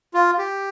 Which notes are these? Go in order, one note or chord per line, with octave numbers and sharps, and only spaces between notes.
F4
G4